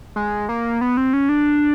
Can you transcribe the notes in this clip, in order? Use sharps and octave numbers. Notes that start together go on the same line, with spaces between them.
G#3
A#3
B3
C4
C#4
D4